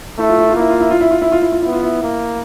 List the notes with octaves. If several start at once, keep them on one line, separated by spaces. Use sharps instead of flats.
A3 E4
F4
E4
F4
A#3 E4
F4
E4
F4
E4
F4
E4
F4
E4
F4
B3 E4
F4
E4
A#3